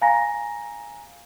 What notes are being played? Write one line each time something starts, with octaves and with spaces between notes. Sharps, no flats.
F5 G#5 A#5 A#6